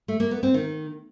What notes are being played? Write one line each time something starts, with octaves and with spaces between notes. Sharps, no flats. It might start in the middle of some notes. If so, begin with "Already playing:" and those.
A3
A#3
B3
C4
D#3